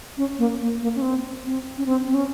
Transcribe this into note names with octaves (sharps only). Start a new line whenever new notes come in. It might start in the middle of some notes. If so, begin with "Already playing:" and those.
C#4
A#3
A#3
A#3
C#4
C4
C4
C#4
C4
C4
C#4